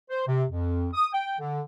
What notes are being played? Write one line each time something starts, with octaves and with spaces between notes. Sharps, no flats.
C5
C3
F2
D#6
G5
D3